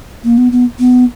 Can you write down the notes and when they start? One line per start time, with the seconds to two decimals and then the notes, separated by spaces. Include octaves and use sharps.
0.24 A#3
0.38 B3
0.52 B3
0.80 B3